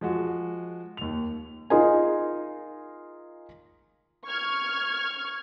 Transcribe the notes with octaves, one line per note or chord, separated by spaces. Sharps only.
F3 G#3 F#4
D#2 F7
D#4 F4 G#4 A#4 G#5
C#6 F6 G#6